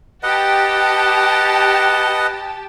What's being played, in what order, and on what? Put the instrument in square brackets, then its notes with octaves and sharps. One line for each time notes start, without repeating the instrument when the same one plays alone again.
[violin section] G4 A5 [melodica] B4 D#5 F#5